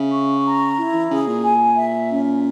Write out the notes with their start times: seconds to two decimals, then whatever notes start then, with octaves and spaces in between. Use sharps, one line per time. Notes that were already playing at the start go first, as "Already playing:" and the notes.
Already playing: C#3 E5
0.12 C#6
0.44 A#5
0.77 E4
0.93 E3
1.11 C#3 G#4
1.27 A#2
1.43 G#5
1.76 E5
2.10 C#4